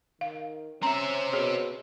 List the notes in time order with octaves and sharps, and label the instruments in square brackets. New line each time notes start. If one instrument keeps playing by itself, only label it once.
[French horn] D#3 [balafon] F5
[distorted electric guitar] C4 E5 [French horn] C#4 [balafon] A#5
[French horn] B2 [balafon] G#4 C#5